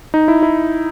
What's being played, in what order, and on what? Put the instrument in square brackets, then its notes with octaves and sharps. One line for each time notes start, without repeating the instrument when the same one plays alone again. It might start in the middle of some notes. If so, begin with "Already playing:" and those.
[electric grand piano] D#4
E4
E4